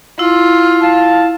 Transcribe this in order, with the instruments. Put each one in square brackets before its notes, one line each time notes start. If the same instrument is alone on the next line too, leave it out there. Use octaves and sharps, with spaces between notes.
[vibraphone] E4 [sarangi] F4
[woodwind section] F5 A5